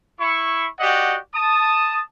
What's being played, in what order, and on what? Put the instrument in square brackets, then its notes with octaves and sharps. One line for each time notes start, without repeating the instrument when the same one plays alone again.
[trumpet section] E4 C#6
F#4 G4 D5 D#5 F#5
A5 D#6